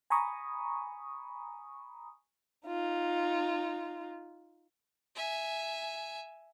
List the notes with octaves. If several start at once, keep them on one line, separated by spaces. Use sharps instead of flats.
G#5 A#5 B5 C#6 D#6
D#4 F4
E5 G#5